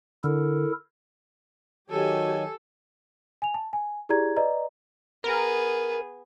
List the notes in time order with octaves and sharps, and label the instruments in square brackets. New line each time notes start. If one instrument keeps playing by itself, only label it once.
[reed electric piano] D3 [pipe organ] E4 A4 A#4
[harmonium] D#3 F#3 [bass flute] F#4 [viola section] G4 G#5 [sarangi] A4
[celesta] G#5 F7
A5
G#5
E4 G4 G#4 D5 A#5 G#6
B4 D5 D#5 A#5
[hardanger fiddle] B3 G#4 [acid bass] A#4